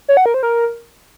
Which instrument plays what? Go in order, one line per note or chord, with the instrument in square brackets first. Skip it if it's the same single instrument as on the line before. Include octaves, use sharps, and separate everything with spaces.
[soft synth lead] C#5
F#5
A#4
C5
A#4